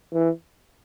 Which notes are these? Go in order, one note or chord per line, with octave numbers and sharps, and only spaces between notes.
E3